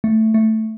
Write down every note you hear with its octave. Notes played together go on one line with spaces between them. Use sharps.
A3
A3